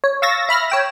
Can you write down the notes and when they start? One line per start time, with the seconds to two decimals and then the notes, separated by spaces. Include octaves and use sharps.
0.04 C#5
0.22 F5 C#6 E6 A6 A#6
0.49 E5 B5 F6 A#6
0.70 C#5 G5 E7